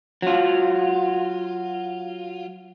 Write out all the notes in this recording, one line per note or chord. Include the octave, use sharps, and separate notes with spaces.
F#3 F4